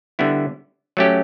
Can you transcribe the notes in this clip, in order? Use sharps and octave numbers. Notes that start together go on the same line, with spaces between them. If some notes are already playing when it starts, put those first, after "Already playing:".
D3 G3 B3 E4
F#3 A3 C#4 G4